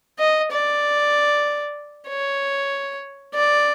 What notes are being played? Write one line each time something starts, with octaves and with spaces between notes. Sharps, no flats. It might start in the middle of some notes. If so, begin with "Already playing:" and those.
D#5
D5
C#5
D5